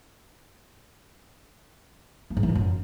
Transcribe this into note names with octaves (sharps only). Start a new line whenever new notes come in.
A#3
G#2
E3
F2
F#2